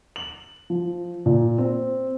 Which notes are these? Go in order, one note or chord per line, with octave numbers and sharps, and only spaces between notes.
F#7
F3
A#2
C4